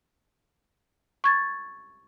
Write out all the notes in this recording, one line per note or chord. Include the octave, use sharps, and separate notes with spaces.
C#6 G#6 A6